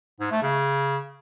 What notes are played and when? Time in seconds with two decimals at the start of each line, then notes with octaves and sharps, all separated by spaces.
0.20 G#2
0.31 A3
0.42 C#3